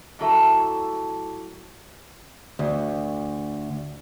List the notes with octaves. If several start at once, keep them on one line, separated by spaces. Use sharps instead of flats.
A2 D3 F#3 A4 E5
D2